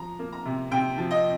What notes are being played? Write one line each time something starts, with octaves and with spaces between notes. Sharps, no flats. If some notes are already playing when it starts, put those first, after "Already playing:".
Already playing: F3 A#5
A#3
A#5
C3
C3 G5
F3
D#5